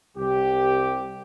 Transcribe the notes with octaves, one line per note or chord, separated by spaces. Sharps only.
C2 G4